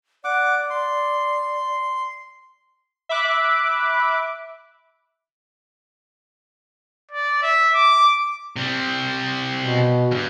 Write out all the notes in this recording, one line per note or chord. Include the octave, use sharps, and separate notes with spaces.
D5 F#5 D6
C6
E5 B5 D6 F#6
D5
E5
D6
C3 G3
B2
E2 G2